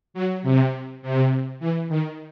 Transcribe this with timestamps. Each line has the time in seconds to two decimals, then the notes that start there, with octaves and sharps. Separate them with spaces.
0.14 F#3
0.43 C3
1.02 C3
1.60 E3
1.89 D#3